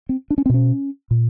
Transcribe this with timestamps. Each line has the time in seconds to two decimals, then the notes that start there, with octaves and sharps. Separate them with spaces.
0.09 C4
0.30 D4
0.38 C#4
0.46 C4
0.49 B2 C#4
1.11 A#2